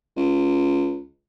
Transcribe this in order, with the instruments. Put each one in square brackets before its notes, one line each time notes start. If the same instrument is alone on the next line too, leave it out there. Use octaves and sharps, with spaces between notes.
[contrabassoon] C#2